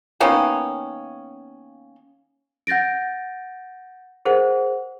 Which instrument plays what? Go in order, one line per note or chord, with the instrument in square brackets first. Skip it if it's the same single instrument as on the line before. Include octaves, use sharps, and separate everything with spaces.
[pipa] D#3 A#3 B3 C#4
[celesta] F#5 G6 A6 A#6 D7
G#4 A#4 C5 F#5